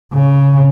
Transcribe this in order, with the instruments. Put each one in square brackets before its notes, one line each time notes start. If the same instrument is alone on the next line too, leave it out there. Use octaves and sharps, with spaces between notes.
[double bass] C#3